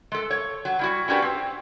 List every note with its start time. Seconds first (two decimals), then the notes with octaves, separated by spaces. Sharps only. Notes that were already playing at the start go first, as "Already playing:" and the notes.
0.12 G#3 A4
0.30 C#5
0.65 F#3
0.79 G3 E4 F#4
1.08 C#4 D4 F#4 G4 B4
1.22 C4